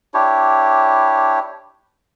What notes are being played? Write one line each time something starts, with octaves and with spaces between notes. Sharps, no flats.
D4 E4 G4 C#5